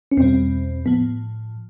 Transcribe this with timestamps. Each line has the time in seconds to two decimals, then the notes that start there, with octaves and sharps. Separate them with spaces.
0.11 C#4
0.17 E2 B2 G3 C4
0.86 A2 F3 B3